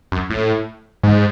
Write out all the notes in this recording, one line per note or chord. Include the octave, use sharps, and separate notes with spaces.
F#2
A2
G#2